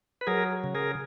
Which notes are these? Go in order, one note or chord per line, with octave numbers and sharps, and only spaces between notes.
B4
F#3 G#4 A#4
C#3
G#4 A#4